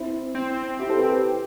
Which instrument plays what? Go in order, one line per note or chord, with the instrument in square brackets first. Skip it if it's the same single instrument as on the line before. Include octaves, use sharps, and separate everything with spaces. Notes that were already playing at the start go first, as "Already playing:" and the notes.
Already playing: [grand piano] C4 E4
[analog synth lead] C4
[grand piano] E4 G4
A4 C5
G4 B4